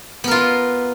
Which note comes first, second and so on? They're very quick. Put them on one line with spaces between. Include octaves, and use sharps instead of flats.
B3 A#4 F4